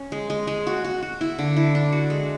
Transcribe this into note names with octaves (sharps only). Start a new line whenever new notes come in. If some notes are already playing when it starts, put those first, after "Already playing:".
Already playing: C#4
G#3
G#3
G#3
F#4
F#4
F#4
E4
D3
E4
D4
F#4
G#3